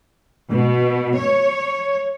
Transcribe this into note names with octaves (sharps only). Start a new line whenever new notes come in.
B2
C#5